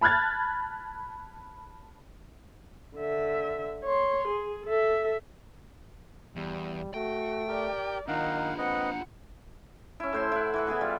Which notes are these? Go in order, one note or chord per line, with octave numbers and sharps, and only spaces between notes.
A5 B5 F6 F#6 G#6 A6
D3 E5
C#5 C6
G#4
A4 E5
E2 G3
A3 F#4 G5
G4 A#4 D5
D#3 D4 D#4 F4 F5 F#5
C4 B4 D#5 F#5
C#4 E4
A2 C5 C6
E4 F#5
E3 B4 F#5
E3 B3 G#4 B4
G3 F4